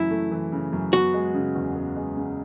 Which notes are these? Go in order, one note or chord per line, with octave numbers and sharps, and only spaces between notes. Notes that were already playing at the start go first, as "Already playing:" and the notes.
Already playing: F#2 C#3 E3 A3 E4
A3
E3
C#3
F#2
B3 F#4
G#3
C#3
E2
B3
G#3
C#3